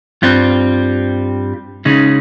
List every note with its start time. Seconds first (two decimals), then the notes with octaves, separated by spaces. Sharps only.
0.22 G2 G3 C4 F4
1.85 C#3 G#3 D#4